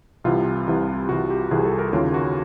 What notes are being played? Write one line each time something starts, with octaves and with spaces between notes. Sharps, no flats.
C2 C3 E3 F4
C2 C3 E3
C2 C3 E3 F#4
G4
C2 C3 E3 G#4
A4
A#4
D#2 C#3 E3 F4
F#4